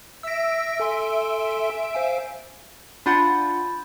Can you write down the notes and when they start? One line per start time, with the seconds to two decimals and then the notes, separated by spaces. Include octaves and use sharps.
0.23 E5 E6 A#6 D7
0.80 A4 G#5 C6
1.95 C5 F5 G#5
3.06 D4 F4 F#5 B5 G6 A6